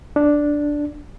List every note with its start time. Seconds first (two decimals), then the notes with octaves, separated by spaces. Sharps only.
0.16 D4